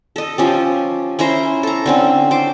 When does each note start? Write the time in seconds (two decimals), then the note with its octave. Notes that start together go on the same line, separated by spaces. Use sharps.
0.16 A4 D#5
0.38 F3 C#4 G4
1.19 C#4 E4 C5 A#5
1.63 A4 A#5
1.86 D3 C4 C#4
2.31 C5 D6